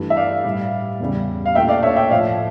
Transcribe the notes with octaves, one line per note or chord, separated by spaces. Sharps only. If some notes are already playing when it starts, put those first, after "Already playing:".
Already playing: G2 E3 A3
E5
D5 F5
A2 G3
E2 C#3 G3
F5
A#2 A3 E5 G5
D5 F5
C#5 E5
E5 G5
A2 F3 A3 D5 F5